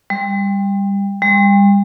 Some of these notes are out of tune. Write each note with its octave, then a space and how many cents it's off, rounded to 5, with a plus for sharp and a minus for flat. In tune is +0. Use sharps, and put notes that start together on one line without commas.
G3 +20
G3 +35